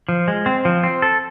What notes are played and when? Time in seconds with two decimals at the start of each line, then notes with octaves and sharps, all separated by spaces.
0.09 F3
0.28 G#3
0.46 C4
0.65 F3
0.84 C4
1.02 A4